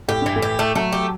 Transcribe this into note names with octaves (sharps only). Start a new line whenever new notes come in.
A2 G4
G2 E3
A2
G4
A3
F#3 A3
G4